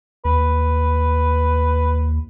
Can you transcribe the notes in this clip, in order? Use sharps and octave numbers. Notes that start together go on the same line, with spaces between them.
D#2 B4